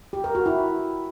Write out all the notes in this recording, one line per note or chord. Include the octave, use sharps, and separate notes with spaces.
G4
A#4
F#4
E4